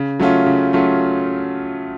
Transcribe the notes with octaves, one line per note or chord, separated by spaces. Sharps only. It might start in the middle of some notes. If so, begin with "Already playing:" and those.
Already playing: C#3
F#3 A3 C#4 F4
C#3
F#3 A3 C#4 F4